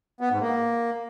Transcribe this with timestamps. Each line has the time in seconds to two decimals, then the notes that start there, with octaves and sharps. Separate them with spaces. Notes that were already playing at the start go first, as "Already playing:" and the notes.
0.21 B3
0.31 G#2
0.41 A#3